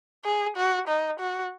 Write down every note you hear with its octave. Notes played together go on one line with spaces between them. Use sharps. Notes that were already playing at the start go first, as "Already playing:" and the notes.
G#4
F#4
D#4
F#4